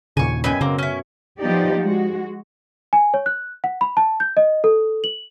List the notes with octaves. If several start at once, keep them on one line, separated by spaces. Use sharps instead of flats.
D#2 A#2 C#3 G#5 C#6
F#2 B2 G5 G#5 B5
C#3 A#3 C4
C#4 E4
F3 B3 D#4 G4 D5
G#3 F#4
G#5
C#5
F#6
F#5
B5
A5
G6
D#5
A4
F#7